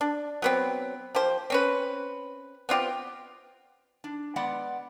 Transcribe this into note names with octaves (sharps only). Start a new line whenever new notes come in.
D4
F#3 B3 C4
F3 G4 C5
C4 C#4 B4
B3 C4 F4 G4
D4
G#3 B3 D5 F#5